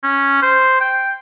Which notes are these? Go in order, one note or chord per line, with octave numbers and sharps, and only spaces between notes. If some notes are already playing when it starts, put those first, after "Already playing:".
C#4
C5
G5